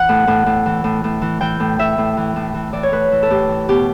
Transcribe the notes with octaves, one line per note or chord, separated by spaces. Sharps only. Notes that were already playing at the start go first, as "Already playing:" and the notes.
Already playing: E3 F#5
A2
A2
A2
E3
A2
A2
E3
E3 G5
A2
E3 E5
A2
E3
A2
E3
E3 D5
C#5
A2 B4
E3
A4
A2 G4
E3
B2 G4